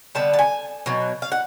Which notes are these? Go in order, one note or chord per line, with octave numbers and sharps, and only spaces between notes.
D3 G3 B3 A5
A5
G#5
B2 F#3
F5
F#5